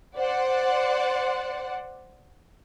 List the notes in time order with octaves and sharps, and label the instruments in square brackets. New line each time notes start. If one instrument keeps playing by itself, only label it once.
[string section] C5 D5 F#5